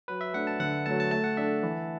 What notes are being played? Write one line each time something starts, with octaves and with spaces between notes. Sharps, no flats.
F#3 B4
E5
A3 D4 F#5
A5
D3 F#5
F#3 A3 A5
A5
A3 A5
F#5
D4 A4 E5
E3